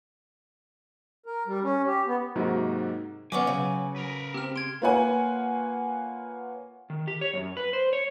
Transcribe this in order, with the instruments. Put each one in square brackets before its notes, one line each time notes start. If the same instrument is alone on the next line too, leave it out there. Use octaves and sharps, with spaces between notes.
[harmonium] A#4
G3
C#4
G4
B3
[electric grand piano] G#2 C3 F#3 A#3 D#4 F#4
[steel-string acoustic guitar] D#3 B3 C#4 [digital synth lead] F#3 [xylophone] F#5 C#6 D6 [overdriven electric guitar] G#5
[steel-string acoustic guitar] C#3
[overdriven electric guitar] A#4 B4
[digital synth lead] C4 [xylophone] G4 F6
[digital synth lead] C6 [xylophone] G#6 D7
[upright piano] A#3 F4 B4 C#5 F#5 G#5
[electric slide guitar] D#3
G4
C#5
F#2
B4
C5
C#5